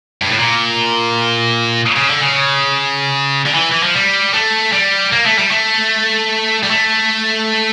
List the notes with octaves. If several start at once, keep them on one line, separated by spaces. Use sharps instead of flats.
G2
A2
A#2
C#3
D3
C#3
D3
E3
E3
F3
G3
A3
G3
A#3
A3
G3
A3
G3
A3